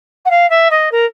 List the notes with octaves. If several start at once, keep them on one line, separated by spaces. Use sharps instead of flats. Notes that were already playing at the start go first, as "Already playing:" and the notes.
F#5
F5
E5
D#5
A#4